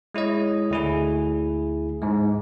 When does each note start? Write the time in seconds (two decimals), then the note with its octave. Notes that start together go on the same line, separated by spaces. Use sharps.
0.14 G#3 E4 C#5 D#5
0.71 D2 E4 G#4
2.02 G#2 G#3